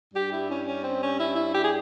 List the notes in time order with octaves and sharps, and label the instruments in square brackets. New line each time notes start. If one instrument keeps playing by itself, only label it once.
[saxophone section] G2 G3 G4
E4
C#4
C#4
C4
C#4
E4
E4
G4
G#4